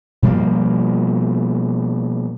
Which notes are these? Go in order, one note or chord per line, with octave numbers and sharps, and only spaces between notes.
B2 F3 G3 A#3